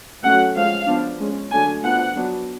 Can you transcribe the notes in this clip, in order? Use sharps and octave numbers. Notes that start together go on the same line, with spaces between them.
F#3 A3 C#4 F#5
F3 G#3 C#4 F5
F3 B3 D4
G#3 C#4
D3 F#3 A3 D4 G#5
F3 B3 D4 F#5
F#3 B3 D4